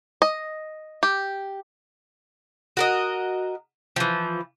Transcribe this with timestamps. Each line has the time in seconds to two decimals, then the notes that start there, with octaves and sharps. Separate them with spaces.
0.22 D#5
1.03 G4
2.77 F#4 A#4 D#5
3.96 E3 F3